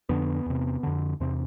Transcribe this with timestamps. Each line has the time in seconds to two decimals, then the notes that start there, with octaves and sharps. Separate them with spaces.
0.09 F2 D3 B3
0.46 E2 C3
0.83 F2 D3
1.20 E2 C3 C4